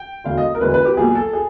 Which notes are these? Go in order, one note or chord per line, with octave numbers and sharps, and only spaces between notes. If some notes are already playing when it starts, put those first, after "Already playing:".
Already playing: G5
E1 D2 D3 F5
D#5
A#4
E1 D2 D3 B4
B4
G4
B1 A#2 G#4
A4
G#4